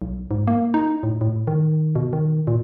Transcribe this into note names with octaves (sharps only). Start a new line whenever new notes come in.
B1
G#2
A#3
D#4
A2
A2
D#3
B2
D#3
A#2